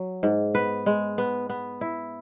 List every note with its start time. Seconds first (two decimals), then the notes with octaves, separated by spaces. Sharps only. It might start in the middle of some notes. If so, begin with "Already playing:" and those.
Already playing: F#3
0.23 G#2
0.55 B3 B4
0.86 G#3
1.18 B3
1.49 B3
1.81 E4